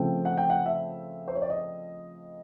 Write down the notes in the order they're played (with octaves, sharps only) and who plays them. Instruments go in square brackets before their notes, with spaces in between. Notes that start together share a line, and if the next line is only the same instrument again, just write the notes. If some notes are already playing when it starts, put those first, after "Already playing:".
Already playing: [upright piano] C#3 F3 A3 C4 G5
F#5
G5
F#5
E5
C5
C#5
D5
D#5